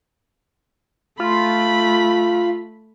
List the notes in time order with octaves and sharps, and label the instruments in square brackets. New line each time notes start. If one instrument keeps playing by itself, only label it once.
[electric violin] A3 B5 [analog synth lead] F4